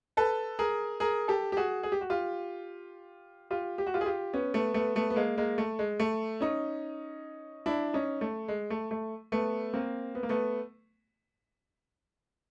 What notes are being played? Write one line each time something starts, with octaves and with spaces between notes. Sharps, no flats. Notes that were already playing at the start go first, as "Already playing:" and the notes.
A4 B4
G#4 A#4
G#4 A#4
G4 A4
G4
F#4 G#4
G#4
G4
F#4
F4 G4
F4 G4
G4
F#4
F4 G4
G#4
F4 G4
B3 C#4
A3 B3
A3 B3
A3 B3
B3
G#3 A#3
G#3 A#3
A3
G#3
A3
C#4 D#4
D4 E4
C#4 D#4
A3
G#3
A3
A3
A3 B3
A#3 C4
B3
A#3
A3 B3